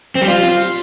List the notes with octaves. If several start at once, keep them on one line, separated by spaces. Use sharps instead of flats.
C4
G3
F4